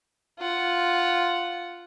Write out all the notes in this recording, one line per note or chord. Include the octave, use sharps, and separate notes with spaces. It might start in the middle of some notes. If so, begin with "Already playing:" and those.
F4 F#5